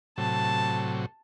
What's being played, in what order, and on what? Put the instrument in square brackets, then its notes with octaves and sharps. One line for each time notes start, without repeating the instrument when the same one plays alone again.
[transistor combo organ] A2 C3 F#3 [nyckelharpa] A5